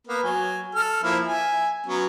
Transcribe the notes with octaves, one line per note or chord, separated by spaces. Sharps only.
A#3 B3 A#4
F#3 G#5
A4 F6
F3 A#3 E4
E5 G#5
F#3 B3 C#4